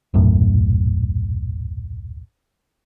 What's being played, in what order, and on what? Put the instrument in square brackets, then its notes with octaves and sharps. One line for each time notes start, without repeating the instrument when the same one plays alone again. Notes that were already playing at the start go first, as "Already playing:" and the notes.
[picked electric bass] D#1 B1 F#2 A2